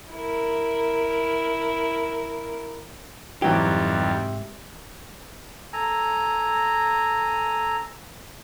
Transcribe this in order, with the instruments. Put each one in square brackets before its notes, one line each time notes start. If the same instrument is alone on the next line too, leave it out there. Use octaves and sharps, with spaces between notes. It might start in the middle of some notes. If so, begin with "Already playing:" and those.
[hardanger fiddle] E4 A#4
[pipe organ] F2 G3 [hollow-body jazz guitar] G#2 G4 [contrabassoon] C3 [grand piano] E3 F#3
[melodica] A4 G#5 A#5